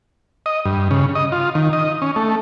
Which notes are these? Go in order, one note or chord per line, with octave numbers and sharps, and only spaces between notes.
D#5
G2
C#3
D#5
F4
D#3
D#5
C#4
A3